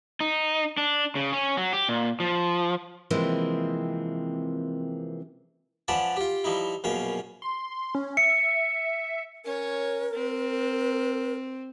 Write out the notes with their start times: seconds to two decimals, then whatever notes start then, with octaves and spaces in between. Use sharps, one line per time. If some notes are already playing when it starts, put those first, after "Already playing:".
0.20 D#4
0.77 D4
1.15 C#3
1.32 C#4
1.57 F#3
1.73 G4
1.89 A#2
2.20 F3
3.10 C3 E3 F3 G#3 A#3 C4
5.88 F3 C#4 B4 D5 F#5 A5
6.17 F4 G4
6.44 F3 G3 D#4 E4
6.84 A#1 F#2 B2 C#4 F5
7.42 C6
7.95 C#4
8.17 E5 C#7
9.45 C#4 A#4 C#5
10.13 C4